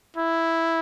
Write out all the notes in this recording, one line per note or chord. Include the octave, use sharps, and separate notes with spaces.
E4